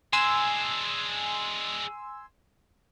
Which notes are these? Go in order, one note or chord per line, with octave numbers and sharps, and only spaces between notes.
G#3 D4 G#5 C6 E6